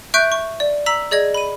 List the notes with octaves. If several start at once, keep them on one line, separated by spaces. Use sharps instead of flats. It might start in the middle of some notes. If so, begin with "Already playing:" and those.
E5 C#6 F#6 G6 D7
C#6
D5
A#5 E6 B6 F#7
G#4 D5 D#5 G#6
B5 D#7